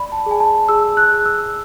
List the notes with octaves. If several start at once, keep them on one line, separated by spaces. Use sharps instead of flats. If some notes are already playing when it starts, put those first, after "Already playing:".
Already playing: D5 B5
A5
G#4 G#5
A5
G#4 E6
F#6
G#4
E6